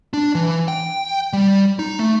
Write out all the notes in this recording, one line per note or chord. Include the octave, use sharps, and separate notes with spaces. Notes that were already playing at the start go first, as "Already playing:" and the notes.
D4
E3
G5
G3
D#4
A3